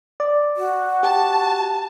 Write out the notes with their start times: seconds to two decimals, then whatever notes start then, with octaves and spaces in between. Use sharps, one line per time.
0.20 D5
0.57 F#4
1.03 G4 A5